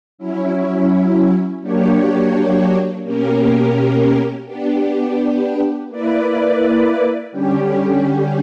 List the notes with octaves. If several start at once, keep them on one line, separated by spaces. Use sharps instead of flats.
F#3 C#4 E4
F#3 A#3 D4 G4 C#5
B2 A#3 C#4 G4 A#4
B3 D4 G4
A#3 E4 B4 D5
D3 G3 C#4 G4